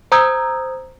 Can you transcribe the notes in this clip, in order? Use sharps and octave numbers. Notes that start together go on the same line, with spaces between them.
C5 A#5 D#6 E6 G6 G#6